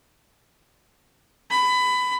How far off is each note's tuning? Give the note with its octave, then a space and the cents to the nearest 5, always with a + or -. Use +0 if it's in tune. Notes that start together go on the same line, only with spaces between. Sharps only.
B5 +20